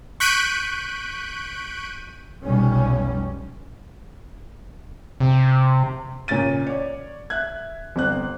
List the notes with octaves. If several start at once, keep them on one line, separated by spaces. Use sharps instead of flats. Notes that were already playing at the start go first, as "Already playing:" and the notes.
C#6 F#6 G6 B6 D7 D#7
F1 B1 B2 G3 C#4
C3
A#2 C#3 C#4 A6 D#7
C#5 D5
E5 F#6 G#6
G1 C4 F#6